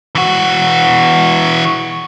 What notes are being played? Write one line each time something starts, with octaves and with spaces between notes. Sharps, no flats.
E3 F#4